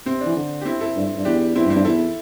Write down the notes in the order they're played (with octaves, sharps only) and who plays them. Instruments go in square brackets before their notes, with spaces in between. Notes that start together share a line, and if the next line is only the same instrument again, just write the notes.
[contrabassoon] C3 [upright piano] C4
[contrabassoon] E3 [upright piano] D4
[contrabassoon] D3
[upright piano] G4
C4 E4
E4 A4
[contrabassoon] G2
G2
[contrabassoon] E2 [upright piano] D4 G4
[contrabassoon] E2 [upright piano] C4 E4
[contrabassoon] G2
[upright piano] C4 E4
[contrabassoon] G2
[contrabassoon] E2 [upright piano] E4 A4